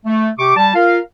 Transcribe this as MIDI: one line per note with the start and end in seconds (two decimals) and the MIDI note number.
0.06 0.29 57
0.38 0.55 48
0.38 0.55 67
0.38 0.55 85
0.38 0.55 86
0.56 0.73 55
0.56 0.73 81
0.75 0.99 65
0.75 0.99 70
0.75 0.99 77